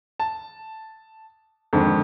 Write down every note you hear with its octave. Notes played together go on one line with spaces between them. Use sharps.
A5
F2 G#2 D3 D#3